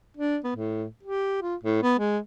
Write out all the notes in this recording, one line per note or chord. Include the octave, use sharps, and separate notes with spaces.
D4
B3
A2
G4
F4
A2
B3
G#3